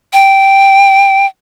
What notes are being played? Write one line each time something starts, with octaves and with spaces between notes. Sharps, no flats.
G5